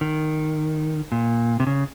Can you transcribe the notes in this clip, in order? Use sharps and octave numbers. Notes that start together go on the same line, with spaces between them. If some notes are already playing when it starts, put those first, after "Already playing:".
D#3
A#2
C3
C#3